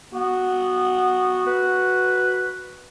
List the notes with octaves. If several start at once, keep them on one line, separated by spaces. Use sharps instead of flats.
B3 F#4
B4